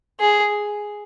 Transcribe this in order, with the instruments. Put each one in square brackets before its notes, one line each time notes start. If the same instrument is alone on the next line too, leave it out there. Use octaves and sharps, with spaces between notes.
[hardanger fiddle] G#4